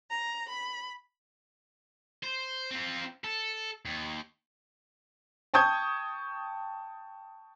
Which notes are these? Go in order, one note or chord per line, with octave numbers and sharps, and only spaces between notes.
A#5
B5
C5
C4 F4
A4
D#2
G5 A5 C#6 D#6 G6 G#6